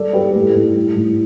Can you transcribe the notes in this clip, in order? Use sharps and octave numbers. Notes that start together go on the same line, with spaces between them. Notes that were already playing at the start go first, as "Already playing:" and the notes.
Already playing: G3 A4 D5
G3 G4 B4
A2 A4
A2
G3
A2